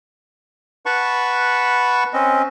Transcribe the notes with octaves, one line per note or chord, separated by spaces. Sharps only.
B4 F#5 A5 B5 C#6
C4 C#4 D#5